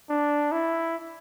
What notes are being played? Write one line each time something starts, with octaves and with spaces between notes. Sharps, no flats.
D4
E4